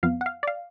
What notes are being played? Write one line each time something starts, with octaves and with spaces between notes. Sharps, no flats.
F2 F3 B3 F5
F#5
F5
D5
F5